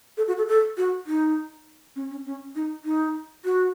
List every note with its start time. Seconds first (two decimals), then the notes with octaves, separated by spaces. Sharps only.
0.17 A4
0.28 F#4
0.38 A4
0.48 A4
0.77 F#4
1.07 D#4
1.96 C#4
2.11 C#4
2.26 C#4
2.55 D#4
2.85 D#4
3.45 F#4